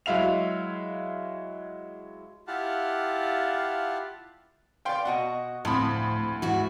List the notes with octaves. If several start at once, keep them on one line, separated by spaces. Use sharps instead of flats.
F#3 G#3 E4 F5 F7
E4 F4 G4 F5 F#5 A5
B4 C#5 D5 F5 G5 C6
B2 F#4 D#5 F#5
D2 A2 F3 C4 B5
G#2 E4 F#4